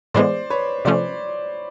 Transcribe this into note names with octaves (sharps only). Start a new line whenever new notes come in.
A2 E3 G#3 B3 C5 D5
B4 C#5
C3 F3 A3 C#4 C5 D5